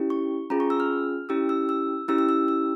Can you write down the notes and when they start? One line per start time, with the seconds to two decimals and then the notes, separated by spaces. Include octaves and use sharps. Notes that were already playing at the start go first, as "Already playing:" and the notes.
Already playing: C#4 E4 G4
0.10 C#6
0.50 C#4 F4 G#4 A#5
0.60 C#6
0.70 E6
0.80 F6
1.29 C#4 E4 G4 E6
1.49 E6
1.69 E6
2.08 C#4 E4 G4 E6
2.18 E6
2.29 E6
2.48 E6